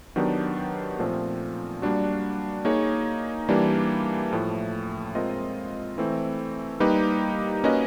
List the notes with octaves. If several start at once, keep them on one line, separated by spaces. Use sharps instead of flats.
D#3 F#3 B3 D4 G4
A#2 F3 A3 C4 F4
G3 A#3 D4 F#4
A#3 D#4 G#4 C#5
E3 G3 A#3 D4 G4
A2 F3 A3
G#3 C4 F4 A#4 D#5
E3 A3 C4
G3 A#3 D#4 G4 B4
A#3 C#4 F#4 B4 D#5